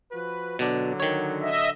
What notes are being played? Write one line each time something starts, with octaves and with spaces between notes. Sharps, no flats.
F3 F#4 B4
B2 D3 F#3 D4
D#3 C#5
D#5 E5